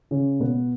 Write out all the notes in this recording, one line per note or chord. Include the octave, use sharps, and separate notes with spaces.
C#3 C#4
B2 B3